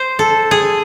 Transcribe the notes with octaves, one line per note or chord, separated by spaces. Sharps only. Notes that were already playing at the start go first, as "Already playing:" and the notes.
Already playing: C5
A4
G#4